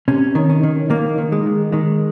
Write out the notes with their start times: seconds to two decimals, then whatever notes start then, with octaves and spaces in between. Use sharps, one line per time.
0.08 C3 C#4
0.35 D#3
0.50 C#4
0.63 D#3
0.90 D#3 A#3
1.18 D#3
1.32 G#3
1.46 D#3
1.72 D#3 G#3